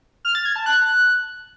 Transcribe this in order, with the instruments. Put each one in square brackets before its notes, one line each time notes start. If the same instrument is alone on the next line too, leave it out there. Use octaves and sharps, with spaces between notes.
[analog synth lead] F6
A6
G#6
A5
F#6